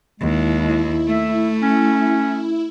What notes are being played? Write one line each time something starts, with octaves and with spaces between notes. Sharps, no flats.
D#2 G#3 E4
A3 E5
C#4